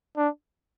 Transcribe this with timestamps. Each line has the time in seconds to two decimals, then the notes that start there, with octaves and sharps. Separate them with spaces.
0.17 D4